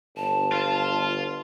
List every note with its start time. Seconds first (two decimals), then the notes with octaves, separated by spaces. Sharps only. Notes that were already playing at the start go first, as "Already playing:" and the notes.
0.17 G1 A5
0.52 F4